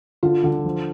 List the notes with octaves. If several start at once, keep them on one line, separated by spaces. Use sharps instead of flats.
D3 F4
D3
F3